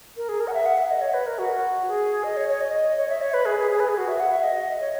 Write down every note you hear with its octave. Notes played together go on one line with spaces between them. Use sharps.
A#4
G#4
A#4
F#5
E5
F#5
E5
D#5
C#5
B4
A#4
F#4
G#4
D#5
C#5
C#5
D#5
C#5
E5
C#5
B4
G#4
G#4
G#4
B4
G#4
F#4
E5
F#5
E5
D#5
C#5